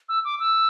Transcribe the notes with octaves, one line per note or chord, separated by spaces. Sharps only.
E6
D6
E6